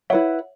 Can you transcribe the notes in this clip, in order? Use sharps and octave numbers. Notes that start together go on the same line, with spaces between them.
E4 B4 C#5 E5 F#5